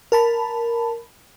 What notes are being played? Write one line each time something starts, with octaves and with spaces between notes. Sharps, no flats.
A#4 A5 B5